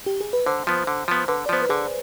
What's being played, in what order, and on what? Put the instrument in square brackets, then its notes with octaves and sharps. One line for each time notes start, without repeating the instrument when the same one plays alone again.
[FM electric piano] G4
G#4
B4
[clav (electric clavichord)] D3 [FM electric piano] C5
[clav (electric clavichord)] F3 B3
D3
F3 B3
[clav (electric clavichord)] D3 [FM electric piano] B4
[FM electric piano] D5
[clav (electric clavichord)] F3 B3 [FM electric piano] C5
[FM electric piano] B4
[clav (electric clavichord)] D3 [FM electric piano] G#4